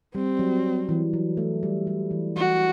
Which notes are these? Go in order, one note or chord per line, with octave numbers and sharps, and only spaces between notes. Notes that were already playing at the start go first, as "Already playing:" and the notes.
G3 C4
F#3
E3
F#3
A3
G3
G3
E3
E3 F#4